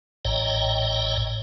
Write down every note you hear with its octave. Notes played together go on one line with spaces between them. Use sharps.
A1 A2 C#5 D#5 G5 A#5